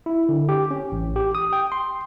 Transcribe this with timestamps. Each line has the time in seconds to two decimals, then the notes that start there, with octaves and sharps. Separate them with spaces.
0.06 E4
0.29 D3
0.49 G4
0.71 C#4
0.92 A1
1.16 G4
1.35 D#6
1.53 G5
1.72 C6